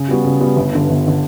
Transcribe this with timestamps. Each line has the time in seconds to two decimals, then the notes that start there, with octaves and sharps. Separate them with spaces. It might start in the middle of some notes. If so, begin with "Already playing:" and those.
Already playing: C#3
0.08 G3 B3 F#4
0.24 C#3
0.40 G3 B3 F#4
0.56 G1
0.72 G2 D3
0.89 G1
1.08 D3